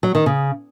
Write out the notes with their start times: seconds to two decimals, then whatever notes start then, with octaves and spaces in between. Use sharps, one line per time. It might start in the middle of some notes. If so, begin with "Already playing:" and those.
0.03 F#3
0.15 D#3
0.26 C#3